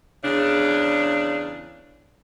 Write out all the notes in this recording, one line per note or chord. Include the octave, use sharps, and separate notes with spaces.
E2 C#3 D4